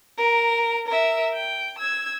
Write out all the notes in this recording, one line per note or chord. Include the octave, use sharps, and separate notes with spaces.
A#4 A#5
A#4 E5
G5
E6 G#6